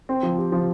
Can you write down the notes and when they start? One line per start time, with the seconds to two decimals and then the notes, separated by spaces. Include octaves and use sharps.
0.09 C4
0.23 F3
0.38 G4
0.52 F3